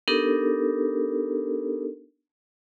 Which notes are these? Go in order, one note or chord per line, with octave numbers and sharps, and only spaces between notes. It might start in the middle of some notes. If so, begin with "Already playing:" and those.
B3 D4 D#4 G4 A4 A#4